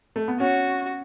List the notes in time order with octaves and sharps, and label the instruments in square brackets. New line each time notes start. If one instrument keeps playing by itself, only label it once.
[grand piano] A3
B3
[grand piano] C#4 [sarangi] F#4